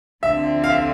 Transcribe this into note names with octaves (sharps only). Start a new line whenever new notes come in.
D2 D3 F3 C4 E5
F5
E5